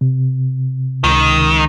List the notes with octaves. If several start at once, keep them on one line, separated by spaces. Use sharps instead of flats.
C3
C#2 D#3